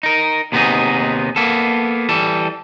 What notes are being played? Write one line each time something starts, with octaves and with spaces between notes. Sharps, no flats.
D#4 A#4
D#2 C3 B3 D4 D#4 G#4
A#3 B3 A4
E3 G3 A4